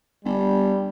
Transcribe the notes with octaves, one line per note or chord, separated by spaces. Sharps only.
G1 G3